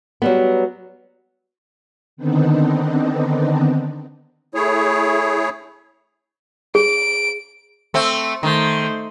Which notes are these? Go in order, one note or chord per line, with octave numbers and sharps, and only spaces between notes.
F#3 G3 B3
D3 D#3 B3 C4 D4 D#4
A3 E4 G#4 C#5
G#4 D7
A3 C4
D#3 A3 C5